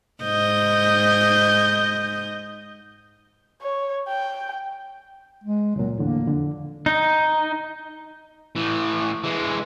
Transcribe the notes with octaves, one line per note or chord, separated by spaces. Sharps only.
G#2 D#5 G6
C#5
G5
G#3
C#2 A#2 F#3
E2 A2 D3 A#3
F2 D3
D#4
A2 E3
E3 G#3